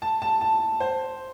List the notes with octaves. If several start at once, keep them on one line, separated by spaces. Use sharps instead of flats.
A5
A5
A5
C5